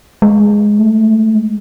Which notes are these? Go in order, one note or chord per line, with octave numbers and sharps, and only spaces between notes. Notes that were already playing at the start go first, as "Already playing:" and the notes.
G#3
A3
G#3